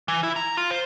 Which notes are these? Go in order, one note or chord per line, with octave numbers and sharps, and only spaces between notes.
E3
E4
A#5
F4
C5